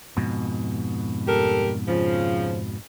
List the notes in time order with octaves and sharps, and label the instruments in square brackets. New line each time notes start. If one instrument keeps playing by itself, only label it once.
[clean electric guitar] F2 G#2 B2
[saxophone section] G3 A4 A#4
C#3 F3